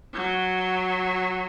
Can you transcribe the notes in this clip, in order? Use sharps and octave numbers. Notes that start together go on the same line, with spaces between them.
F#3